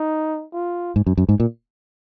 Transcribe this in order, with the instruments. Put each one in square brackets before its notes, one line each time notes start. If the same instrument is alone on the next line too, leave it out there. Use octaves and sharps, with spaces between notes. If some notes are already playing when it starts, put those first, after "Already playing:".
Already playing: [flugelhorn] D#4
F4
[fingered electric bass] G#2
F#2
F#2
G#2
A#2